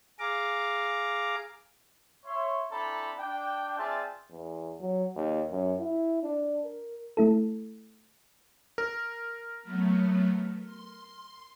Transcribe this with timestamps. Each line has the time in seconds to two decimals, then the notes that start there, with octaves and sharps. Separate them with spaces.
0.20 G#4 F5 A#5 D6
2.25 C#5 E5 C6
2.71 C4 D4 E4 A4 A#5 B5
3.18 D4 G5
3.77 C4 F4 G#4 D5 E5 A5
4.31 E2
4.81 F#3
5.16 D#2
5.51 F#2
5.80 E4
6.23 D4
6.64 A#4
7.17 A3 E4 A4
8.78 A#4
9.62 F#3 A3 B3
10.64 C6